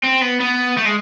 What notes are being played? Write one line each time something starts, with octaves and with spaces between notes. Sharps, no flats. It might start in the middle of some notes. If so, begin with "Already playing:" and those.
C4
B3
B3
A3
G#3